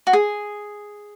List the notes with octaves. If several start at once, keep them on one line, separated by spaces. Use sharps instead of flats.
F#4
G#4